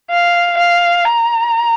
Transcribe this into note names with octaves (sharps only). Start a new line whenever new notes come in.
F5
F5
A#5